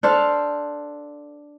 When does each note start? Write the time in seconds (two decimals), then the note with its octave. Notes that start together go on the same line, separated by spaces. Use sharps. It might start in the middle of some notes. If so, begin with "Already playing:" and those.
0.03 D4 A4 C5 F5